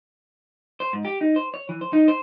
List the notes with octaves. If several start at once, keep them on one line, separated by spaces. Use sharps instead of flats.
C5
G#2
G4
D#4
C5
C#5
E3
C5
D#4
C5